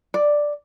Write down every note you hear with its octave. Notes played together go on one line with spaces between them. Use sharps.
D5